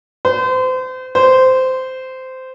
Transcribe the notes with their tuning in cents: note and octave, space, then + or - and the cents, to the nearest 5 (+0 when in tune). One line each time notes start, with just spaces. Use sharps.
C5 -35
C5 -15